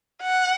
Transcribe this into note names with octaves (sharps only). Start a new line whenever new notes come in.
F#5